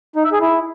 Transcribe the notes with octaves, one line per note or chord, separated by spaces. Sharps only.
D#4
E5
G#4
E4